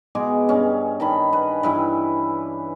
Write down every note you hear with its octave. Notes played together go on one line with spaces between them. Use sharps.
B2 G#3 G#5 D6
G2 C#4
D#3 A5 B5
B4
G2 E3 E4 B5